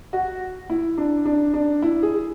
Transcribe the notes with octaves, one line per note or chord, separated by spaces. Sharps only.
F#4
E4
D4
D4
D4
E4
G#4